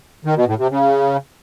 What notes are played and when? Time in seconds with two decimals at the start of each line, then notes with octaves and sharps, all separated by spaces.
0.25 D#3
0.36 B2
0.47 A2
0.59 C3
0.70 C#3